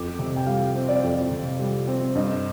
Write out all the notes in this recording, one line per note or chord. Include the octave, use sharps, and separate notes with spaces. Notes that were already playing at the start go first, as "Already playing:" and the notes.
Already playing: F2 D6
C3
G5
G3 F5
C4
D5
F2
C3
G3
C4
G2 D#5